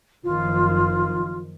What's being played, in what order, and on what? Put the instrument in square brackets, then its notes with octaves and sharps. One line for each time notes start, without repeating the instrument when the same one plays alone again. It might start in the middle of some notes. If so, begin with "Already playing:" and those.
[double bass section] F#1 D#3 F3 [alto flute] F4